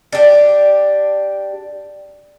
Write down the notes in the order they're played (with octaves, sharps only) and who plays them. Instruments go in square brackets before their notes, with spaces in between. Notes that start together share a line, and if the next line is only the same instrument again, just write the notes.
[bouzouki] D4 G4